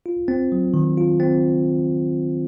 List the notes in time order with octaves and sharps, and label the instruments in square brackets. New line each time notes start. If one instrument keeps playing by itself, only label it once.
[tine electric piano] F4
C4
F#3
D#3
F4
C4